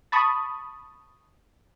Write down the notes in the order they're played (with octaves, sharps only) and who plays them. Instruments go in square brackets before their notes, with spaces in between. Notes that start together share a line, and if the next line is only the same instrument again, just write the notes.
[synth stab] A5 B5 C#6 D#6